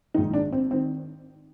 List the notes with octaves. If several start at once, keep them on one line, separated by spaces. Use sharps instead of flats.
A#1 G#2 D#3 D#4
D4
C4
D#3 C4